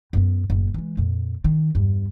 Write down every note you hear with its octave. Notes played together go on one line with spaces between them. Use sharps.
F#2 B3
F#1 A2
E3 G#3
F2 A#2
D#3
E2 G2